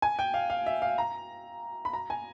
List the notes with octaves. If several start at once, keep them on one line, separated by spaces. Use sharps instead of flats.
G#5
G5
F5
F5
E5
F5
A#5
B5
A#5
G#5